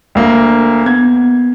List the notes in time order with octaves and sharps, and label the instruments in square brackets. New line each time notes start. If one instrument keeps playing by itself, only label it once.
[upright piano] D2 A#3
[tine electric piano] B3 [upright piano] G#6